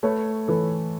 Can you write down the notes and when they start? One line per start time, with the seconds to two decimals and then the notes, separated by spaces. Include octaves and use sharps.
0.03 A3 B4 C#5
0.48 E3 A4 B4